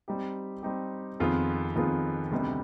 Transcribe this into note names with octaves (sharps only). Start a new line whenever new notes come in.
G3 C4 D#4 G4
G3 C4 D#4 G4
F2 D#3 B3 F4 G#4
F2 D#3 B3 F4 G#4
D2 C3 G3 B3 D#4